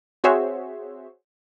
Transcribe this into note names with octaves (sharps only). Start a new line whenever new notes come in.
C4 F#4 G#4 C5 C#5 E5